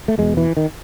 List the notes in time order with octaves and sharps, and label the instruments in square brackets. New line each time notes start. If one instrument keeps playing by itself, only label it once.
[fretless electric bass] A3
E2 B2 G#3
E3
D#3